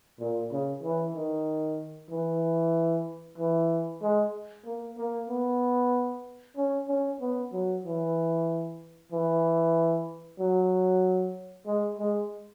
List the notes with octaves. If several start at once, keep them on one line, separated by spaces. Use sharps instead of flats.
A#2
C#3
E3
D#3
E3
E3
G#3
A#3
A#3
B3
C#4
C#4
B3
F#3
E3
E3
F#3
G#3
G#3